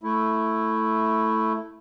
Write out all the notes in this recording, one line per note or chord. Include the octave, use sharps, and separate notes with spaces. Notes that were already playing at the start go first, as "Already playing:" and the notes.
A3 E4